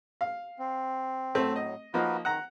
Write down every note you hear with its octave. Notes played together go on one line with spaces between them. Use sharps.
F5
C4
A2 F#3 A3 C4
D#5
F3 A#3 D#4 F#4 A#4 B4
D#3 F#5 A#5